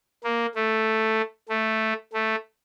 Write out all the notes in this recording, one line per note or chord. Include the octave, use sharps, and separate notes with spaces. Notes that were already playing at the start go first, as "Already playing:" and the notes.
A#3
A3
A3
A3